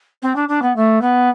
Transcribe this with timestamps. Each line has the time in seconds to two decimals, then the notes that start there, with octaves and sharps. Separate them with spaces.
0.22 C4
0.35 D4
0.48 D4
0.62 B3
0.76 A3
1.01 B3